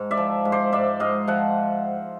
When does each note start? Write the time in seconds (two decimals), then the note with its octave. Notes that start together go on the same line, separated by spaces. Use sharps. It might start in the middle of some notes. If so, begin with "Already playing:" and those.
Already playing: G#2
0.11 D5 E5
0.17 F3
0.45 G#2
0.52 C5 D5
0.72 G#2 D5 E5
1.00 G#2 D#5 F5
1.27 F3 E5 F#5